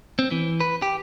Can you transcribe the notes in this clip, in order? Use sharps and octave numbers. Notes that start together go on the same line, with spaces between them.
C4
E3
B4
G4